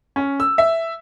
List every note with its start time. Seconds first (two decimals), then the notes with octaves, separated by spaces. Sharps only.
0.16 C#4
0.40 E6
0.58 E5